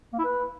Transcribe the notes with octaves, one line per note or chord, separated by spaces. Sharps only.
A#3
E4
B4